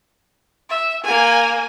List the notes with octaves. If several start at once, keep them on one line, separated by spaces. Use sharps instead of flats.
E5
A#3 G#5